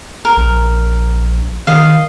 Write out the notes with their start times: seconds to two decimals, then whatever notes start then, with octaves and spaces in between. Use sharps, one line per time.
0.25 A#4
0.37 A#1
1.67 D#3 D#5 F5